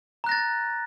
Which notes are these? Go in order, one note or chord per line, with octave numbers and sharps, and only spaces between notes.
A#5 F#6 A6 A#6